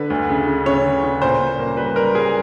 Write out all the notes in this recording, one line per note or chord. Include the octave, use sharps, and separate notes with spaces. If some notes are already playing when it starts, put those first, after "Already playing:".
Already playing: D3 B4
D2
C#3
C#3
C#3 C#5
C#3
C#3
A#2 C5
A#2
A#3
G3 B4
G3 A#4
G3 G#4